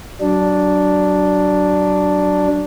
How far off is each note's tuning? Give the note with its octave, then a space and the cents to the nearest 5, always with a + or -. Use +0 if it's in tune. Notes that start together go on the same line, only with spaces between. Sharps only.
F#3 +25 D4 +0